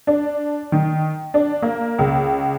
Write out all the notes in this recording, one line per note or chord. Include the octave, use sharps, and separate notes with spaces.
D4
D#3
D4
A#3
C#2